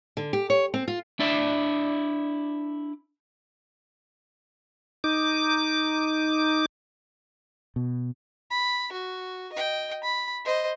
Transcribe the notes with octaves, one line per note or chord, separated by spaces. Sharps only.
D3
G4
C#5
C4
F4
D4 E4 D5 E5
D#4 D6
B2
B5
F#4
D#5 G5
B5
C5 D#5